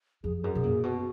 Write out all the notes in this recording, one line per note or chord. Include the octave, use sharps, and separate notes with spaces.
F2 G#4
F#2 G#4
B2 G#4
A#2
B2 F#4